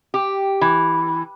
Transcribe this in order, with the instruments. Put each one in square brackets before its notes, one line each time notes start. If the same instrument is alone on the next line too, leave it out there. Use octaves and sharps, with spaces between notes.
[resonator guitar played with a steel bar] G4
E3